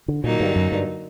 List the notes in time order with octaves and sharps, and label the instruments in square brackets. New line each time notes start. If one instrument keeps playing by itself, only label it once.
[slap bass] D3
[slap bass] A#2 [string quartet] D3 F#3 A#3 D#4
[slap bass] G2
F#2
G2